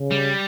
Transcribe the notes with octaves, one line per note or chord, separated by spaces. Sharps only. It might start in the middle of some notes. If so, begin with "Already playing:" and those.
Already playing: C#3
G3